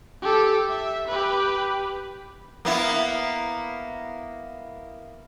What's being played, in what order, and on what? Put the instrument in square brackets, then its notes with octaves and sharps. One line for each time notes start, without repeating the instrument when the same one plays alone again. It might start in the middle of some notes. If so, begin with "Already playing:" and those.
[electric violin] G4 A4
E5
G4 B4
[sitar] A#3 B3 E4